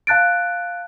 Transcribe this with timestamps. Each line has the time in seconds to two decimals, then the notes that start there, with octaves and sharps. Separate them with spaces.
0.07 F5 A5 F#6 A6 D7